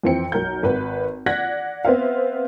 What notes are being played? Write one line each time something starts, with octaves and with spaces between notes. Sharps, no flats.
F2 E3 C4 G5 C#7
B1 A#4 G6
G#1 B4
D5 F#5 F#6 G#6 A#6 B6
B3 C4 C5 E5 F5